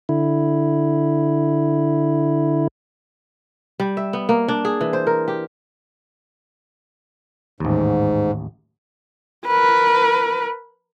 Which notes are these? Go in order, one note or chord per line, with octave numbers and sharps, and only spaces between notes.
D3 E4
G3
E5
B3
A#3
D4
G#4
E3
C5
A#4
G4
A1 D#2 G#2
A#4 B4